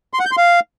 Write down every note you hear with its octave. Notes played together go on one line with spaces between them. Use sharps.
C6
F#5
G6
C6
F5